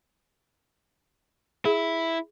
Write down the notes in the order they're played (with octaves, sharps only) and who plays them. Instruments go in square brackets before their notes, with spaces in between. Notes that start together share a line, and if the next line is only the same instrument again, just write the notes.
[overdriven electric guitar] E4 [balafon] G#4